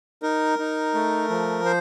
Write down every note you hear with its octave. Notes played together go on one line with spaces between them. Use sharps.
D#4 A#4
D#4
A3
F3
C5